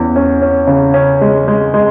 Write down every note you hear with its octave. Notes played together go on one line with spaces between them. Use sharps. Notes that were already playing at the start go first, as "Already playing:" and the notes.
Already playing: E2 C#4
C#4
C#4
C#3
C#4
G#3
G#3
G#3